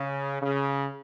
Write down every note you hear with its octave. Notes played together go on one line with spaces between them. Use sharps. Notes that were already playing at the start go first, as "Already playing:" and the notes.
Already playing: C#3
C#3